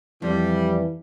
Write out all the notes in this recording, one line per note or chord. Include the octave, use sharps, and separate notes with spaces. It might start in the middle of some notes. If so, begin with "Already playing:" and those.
F2 E3 G3